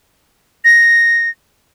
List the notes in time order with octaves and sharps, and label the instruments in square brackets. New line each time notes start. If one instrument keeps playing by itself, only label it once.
[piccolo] A#6